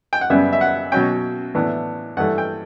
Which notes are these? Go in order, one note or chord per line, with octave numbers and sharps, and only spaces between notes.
G5
F#5
F#2 C#3 G3 B3 E5
E5
F#5
B2 F#3 C#4 G5
A2 E3 B3 D4
G2 E3 A3 F#5
G5